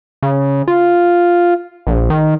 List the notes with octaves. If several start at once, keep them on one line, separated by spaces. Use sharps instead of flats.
C#3
F4
A#1
D#3